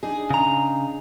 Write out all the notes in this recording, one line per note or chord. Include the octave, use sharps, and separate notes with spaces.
D4 D#4 G#4
C#3 A#5